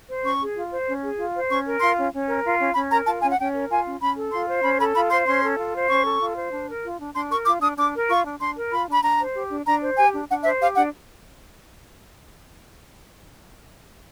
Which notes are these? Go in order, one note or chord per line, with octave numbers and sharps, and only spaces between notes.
C5
C#4 C#6
G#4
F4
C5
C#4
G#4
F4
C5
C#4 C#6
A#4
F4 C6
C#4
C#4
A#4
F4
C#4
C#4 B5
A#4 A#5
F4 A5
C#4 G#5
F#5
C#4 G5
A#4
F4 G#5
C#4
C#4 B5
A4
F4 C6
C5
C#4 B5
A4 B5
F4 B5
C5 C6
C#4 C6
A4
F4
C5
C#4 C#6
A4
F4
C5
D4
A#4
F4
D4
D4 C6
A#4 C#6
F4 D6
D4 D#6
D4 D6
A#4
F4 C#6
D4
D4 C6
A#4
F4 B5
D4 B5
D4 A#5
C5
G4
D4
D4 A#5
C5
G4 G#5
D4
D4 F#5
C5 E5
G4 F5
D4 F#5